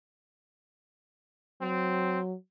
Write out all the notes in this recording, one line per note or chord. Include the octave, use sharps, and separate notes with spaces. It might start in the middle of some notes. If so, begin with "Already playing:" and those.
F#3 C4